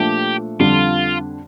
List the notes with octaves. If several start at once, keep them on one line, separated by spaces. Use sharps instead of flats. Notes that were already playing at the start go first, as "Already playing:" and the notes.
Already playing: A#2 F3 A3 D4 G4
F2 D3 G3 D4 F4